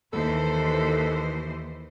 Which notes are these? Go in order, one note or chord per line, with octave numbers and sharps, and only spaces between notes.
D#2 E3 A4 C5